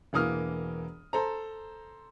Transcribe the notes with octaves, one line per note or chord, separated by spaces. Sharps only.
E1 E3 A#3 D#6 F6
A4 C5 A#5